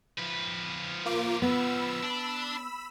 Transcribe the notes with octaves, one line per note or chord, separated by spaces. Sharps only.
F3 B4
A#3 F4 D6
B3 B5 E6
D4